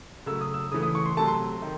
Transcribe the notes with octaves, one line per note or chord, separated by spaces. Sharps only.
C#3 F#3 A3 E6
D#6
E6
C#3 E3 A3 D#6
D#6
C#6
C6
C3 F#3 A3 A5
C6
D#3